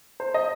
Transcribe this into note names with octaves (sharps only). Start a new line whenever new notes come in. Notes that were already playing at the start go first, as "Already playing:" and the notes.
C5
D#5